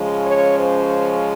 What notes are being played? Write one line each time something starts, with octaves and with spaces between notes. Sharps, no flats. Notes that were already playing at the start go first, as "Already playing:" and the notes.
Already playing: C#3 F3 G#3 C#4
C#5
C5